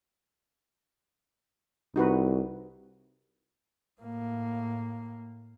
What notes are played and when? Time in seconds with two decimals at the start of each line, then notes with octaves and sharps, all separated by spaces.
1.96 C2 D#4 F#4 B4
4.01 A2 A#3